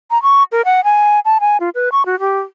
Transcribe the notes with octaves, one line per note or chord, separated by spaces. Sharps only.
A#5
C#6
A#4
F#5
G#5
A5
G#5
F4
B4
C#6
F#4
G4